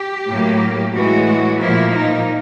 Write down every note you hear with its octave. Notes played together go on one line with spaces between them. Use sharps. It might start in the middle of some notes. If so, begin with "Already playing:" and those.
Already playing: G4
A2 F#3 A#3
A2 E3 G#3 F#4
A#2 F3 A#3 E4
D#4